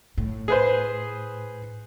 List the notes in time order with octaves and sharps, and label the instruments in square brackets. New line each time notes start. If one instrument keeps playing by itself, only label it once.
[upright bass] A2
[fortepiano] G#4 B4 C5